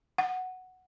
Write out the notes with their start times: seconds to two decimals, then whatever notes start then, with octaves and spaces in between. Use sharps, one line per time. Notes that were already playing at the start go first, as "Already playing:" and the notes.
0.18 F#5